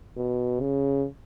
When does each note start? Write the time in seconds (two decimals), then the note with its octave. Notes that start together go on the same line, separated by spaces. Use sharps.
0.17 B2
0.60 C#3